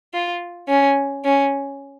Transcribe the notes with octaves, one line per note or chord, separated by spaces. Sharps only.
F4
C#4
C#4